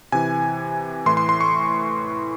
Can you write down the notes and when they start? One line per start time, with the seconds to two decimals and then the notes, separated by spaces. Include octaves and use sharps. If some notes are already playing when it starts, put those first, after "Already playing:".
0.12 C3 E3 G#5
1.06 A2 E3 C6
1.17 C6
1.29 C6
1.41 C#6